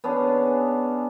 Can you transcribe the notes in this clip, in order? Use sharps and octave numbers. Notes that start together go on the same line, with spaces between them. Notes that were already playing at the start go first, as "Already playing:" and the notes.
B3 C#4 D4 G#4